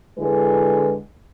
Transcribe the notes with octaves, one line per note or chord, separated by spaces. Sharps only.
D3 G#3 E4 B4